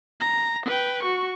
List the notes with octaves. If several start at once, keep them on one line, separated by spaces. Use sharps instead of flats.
A#5
B4 G5
F#4 C#6